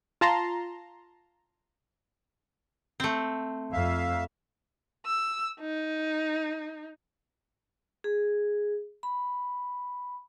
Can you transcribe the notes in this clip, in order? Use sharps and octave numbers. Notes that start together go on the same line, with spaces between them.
F4 A5 A#5 C6
A3 C4
F2 E5 F5
E6
D#4
G#4
B5